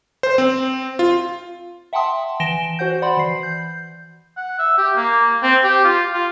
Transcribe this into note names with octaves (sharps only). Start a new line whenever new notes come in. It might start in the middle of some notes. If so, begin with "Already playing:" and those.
C5
C4
F4
E5 F#5 G5 A5 C6 D#6
E3 G#5 A#6 D7 E7 G7
F#4 C5 F#5 G6
D5 F#5 B5 C6
E3 C7
G6
F#5
E5
G4
A#3
C4
G4
F4
F4